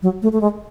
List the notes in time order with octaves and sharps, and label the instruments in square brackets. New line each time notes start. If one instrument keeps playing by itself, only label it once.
[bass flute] F#3
A3
A3
G#3